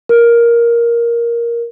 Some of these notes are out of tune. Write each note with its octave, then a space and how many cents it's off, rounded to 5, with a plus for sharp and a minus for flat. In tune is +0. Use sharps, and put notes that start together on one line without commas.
A#4 +10